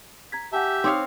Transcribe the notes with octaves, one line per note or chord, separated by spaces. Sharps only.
A#5 G#6 B6
G4 E5 F#5 G#5 A5
C4 D#4 C#5 F5 D6 D#6